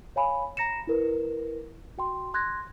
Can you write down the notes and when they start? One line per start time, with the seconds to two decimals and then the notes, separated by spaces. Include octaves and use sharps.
0.16 C#5 F5 G#5 B5
0.57 A#5 A#6 C#7 E7
0.87 E4 A#4 B4
1.98 F#4 G5 C6
2.34 C6 F#6 G#6 A#6